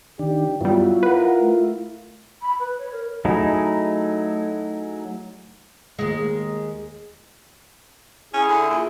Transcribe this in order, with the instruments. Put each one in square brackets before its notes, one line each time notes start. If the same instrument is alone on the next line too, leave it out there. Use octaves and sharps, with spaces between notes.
[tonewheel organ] D#3 D4 [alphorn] G4
[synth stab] G2 G3 [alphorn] F#3 [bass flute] B3 [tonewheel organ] E4 F4
[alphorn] A#4 [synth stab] B4 [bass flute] F#5
[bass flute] A3
[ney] B5
B4
C#5
A#4
[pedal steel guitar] F#3 A3 D#4 E4 G#4
[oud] D#2 G#3
[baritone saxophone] C#4 [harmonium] E4 G#4
[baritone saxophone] D3
A#2